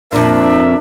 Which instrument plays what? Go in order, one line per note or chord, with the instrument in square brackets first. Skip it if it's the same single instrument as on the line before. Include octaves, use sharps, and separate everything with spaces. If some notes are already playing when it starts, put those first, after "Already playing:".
[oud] F2 A#2 [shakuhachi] D4 [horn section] A#4 E5